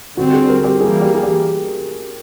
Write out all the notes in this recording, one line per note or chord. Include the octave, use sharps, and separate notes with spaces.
D3 G3 C4 F#4
G#4
A#4
G4
E3 G3 A#3 G#4
G4
G#4
G4